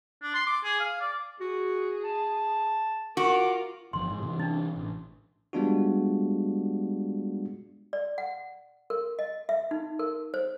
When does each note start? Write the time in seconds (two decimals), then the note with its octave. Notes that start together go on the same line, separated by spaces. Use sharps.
0.23 D4
0.34 C6
0.47 D6
0.64 G#4
0.80 F5
1.01 D5
1.41 F#4 G#4
2.04 A5
3.17 F4 F#4 A#4 D6
3.93 G1 F3 C6
4.10 G#2
4.22 C3 E3
4.39 D4 D#4
4.76 A1
5.53 G3 G#3 B3 D4 F4 F#4
7.93 D5
8.18 F#5
8.90 A#4
9.19 D#5
9.49 E5
9.71 D#4
9.99 A#4
10.34 C5